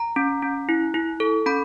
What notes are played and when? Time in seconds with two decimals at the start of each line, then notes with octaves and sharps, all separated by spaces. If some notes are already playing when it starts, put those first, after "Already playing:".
Already playing: A#5
0.16 C#4
0.42 C#4
0.69 E4
0.94 E4
1.20 A4
1.46 C#4 B5